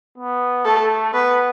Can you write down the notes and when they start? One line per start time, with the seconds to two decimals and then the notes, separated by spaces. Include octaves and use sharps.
0.18 B3
0.65 A3 A4
1.14 B3 B4